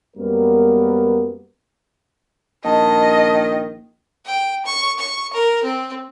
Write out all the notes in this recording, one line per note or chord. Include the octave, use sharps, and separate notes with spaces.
F#2 G3 A#3 B3 A#4
A#1 D#3 D#5 A5
G5
C#6
C#6
A#4
C4